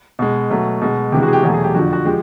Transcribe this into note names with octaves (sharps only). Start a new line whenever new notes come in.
B2 G#3
B2 F#3 A3
B2 G#3
C3 E3 G#3 G4
F#4
G#4
G4
E2 B2 F#3 A3 G#4
G#4
G4
F2 D3 F3 F#4
F#4
F3 G#3 G4